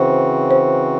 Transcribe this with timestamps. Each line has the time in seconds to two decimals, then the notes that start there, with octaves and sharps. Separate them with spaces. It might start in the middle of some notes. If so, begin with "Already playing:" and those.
Already playing: C#3 E3 C4 F#4 C5
0.51 C5